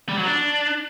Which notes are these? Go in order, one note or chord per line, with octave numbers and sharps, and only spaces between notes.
G3
F#3
D4